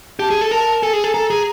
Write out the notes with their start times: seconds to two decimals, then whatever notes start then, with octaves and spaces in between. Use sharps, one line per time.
0.19 G4 A5
0.31 G#4
0.41 A4
0.51 A#4 A5
0.83 A4 G#5
0.93 G#4
1.04 A4
1.14 A4 A#5
1.30 G#4